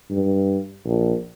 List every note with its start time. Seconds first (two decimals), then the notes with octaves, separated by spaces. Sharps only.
0.11 G2
0.86 A#1